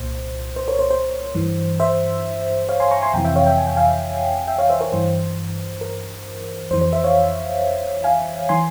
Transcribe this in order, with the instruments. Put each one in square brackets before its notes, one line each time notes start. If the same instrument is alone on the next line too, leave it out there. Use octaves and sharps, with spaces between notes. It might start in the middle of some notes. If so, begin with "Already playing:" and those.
Already playing: [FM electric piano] C2 A#2 C5
C5
A#4 C#5
C5
C5
G2 E3
C5 E5
C#5 F5
G#5 C6
A#5 C#6
G#5 C6
F2 C3 E3 G5 A#5
E5 G5
C#5 F5
E5 G5
G#5
G5
F5 G#5
E5 G5
C#5 F5
C5 E5
A#4 C#5
G2 E3 C5
A#4
F2 C5
E3
C5
C5 E5
C#5 F5
F5 G#5
E3 G#5 C6